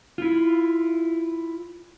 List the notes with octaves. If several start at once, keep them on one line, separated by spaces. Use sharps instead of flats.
E4 F4